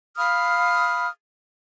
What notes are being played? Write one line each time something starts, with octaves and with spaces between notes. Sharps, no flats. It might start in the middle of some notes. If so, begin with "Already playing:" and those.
F5 B5 D#6 F6